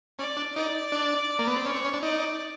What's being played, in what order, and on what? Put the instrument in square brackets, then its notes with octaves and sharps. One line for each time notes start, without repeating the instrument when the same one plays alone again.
[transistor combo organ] C#4 [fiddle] D5
[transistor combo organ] D4
[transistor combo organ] D#4 [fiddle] D5
[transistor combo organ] D4
A#3
B3
C4
[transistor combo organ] C#4 [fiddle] C#5
[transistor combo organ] C4
C#4
D4
[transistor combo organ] D#4 [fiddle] D5